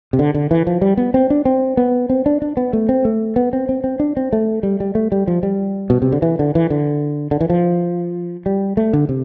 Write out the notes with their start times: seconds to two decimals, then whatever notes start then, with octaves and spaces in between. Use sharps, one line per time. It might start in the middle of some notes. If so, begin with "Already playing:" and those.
0.13 C3
0.19 D3
0.34 D3
0.51 E3
0.67 F3
0.82 G3
0.97 B3
1.14 C4
1.30 D4
1.45 C4
1.77 B3
2.10 C4
2.26 D4
2.42 D4
2.57 B3
2.73 A3
2.89 C4
3.05 A3
3.36 B3
3.53 C4
3.69 C4
3.84 C4
4.00 D4
4.17 C4
4.33 A3
4.63 G3
4.80 G3
4.95 A3
5.12 G3
5.27 F3
5.43 G3
5.90 B2
6.02 C3
6.12 D3
6.22 E3
6.39 D3
6.55 E3
6.70 D3
7.31 D3
7.41 E3
7.50 F3
8.46 G3
8.77 A3
8.93 D3
9.09 C3